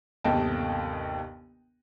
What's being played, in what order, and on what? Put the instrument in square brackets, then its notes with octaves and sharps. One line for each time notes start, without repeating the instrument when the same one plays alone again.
[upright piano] G1 D#2 C3 D#5 G5 A5